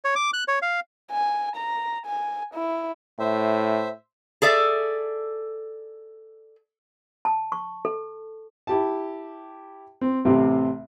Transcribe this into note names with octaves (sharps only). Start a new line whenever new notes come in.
C#5
D6
F#6
C#5
F5
G#5
A#5
G#5
E4
A2 C5 E5
G#4 A4 D5 E5
A5
C#6
A4
E4 G4 A5
C4
A1 C3 C4 G4